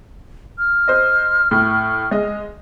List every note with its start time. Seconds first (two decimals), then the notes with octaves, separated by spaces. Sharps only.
0.59 F6
0.88 C5 D#5
1.51 A2
2.11 G#3 D#5